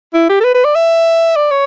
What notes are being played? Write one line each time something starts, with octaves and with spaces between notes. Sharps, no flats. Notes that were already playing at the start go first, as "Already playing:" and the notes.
E4
G4
A4
B4
B4
D5
E5
D5
C#5